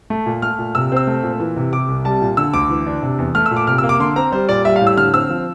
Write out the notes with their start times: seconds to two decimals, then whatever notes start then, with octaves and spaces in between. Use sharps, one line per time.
0.10 A3
0.26 A#2
0.42 A3 F6
0.59 A#2
0.75 C3 E6
0.92 C4 E6
1.07 A3
1.23 A#2
1.40 E3
1.56 C3
1.73 C3 D6
1.89 C2
2.05 G3 A5
2.22 A#2
2.37 D3 E6
2.54 D2 D6
2.70 E3
2.86 D4
3.02 C3
3.18 E2
3.35 A3 F6
3.46 E6
3.51 A#2
3.57 D6
3.67 C3 F6
3.78 E6
3.83 A#3
3.89 D6
4.00 D3 C6
4.16 C4 A#5
4.32 G3 C5
4.49 A#2 D5
4.65 G3 E5
4.76 F5
4.81 A2
4.87 E6
4.97 D3 F6
5.14 C4 E6
5.30 F3